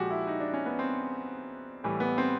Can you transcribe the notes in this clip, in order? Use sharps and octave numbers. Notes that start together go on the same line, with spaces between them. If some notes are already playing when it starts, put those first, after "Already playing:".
Already playing: A#2 F3 G#3 F#4 G4
E4
D#4
D4
C#4
B3
C4
A2 E3 G3
B3
C4